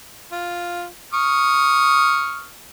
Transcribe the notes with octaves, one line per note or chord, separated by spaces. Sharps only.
F4
C#6 D#6 F6